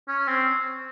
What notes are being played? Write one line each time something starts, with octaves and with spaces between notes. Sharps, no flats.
C#4
C4